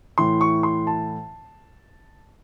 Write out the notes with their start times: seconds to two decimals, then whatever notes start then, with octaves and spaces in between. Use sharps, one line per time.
0.18 A2 E3 C6
0.41 C#6
0.63 C6
0.87 A5